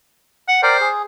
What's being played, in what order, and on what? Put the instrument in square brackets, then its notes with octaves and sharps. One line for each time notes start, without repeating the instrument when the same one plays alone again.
[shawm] F#5
[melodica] A#4 D5 G5 [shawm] C5
[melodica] G#4